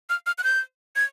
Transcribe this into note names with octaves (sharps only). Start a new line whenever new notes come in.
F6
F6
F#6
G6
G#6